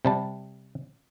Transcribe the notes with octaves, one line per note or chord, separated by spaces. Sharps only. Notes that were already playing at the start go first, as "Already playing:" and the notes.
C3 G3 A5